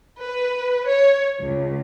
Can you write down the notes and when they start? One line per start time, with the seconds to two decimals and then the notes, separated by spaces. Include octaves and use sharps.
0.22 B4
0.87 C#5
1.44 C#2